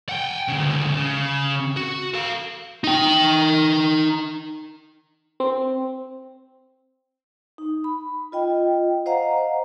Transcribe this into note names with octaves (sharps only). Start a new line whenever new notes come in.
F#5 G5
D2 C#3
C#3
F#4
A4 F5
D#4 G5
C4
D#4
B5
F4 D#5 G5
C5 D#5 F5 F#5 A#5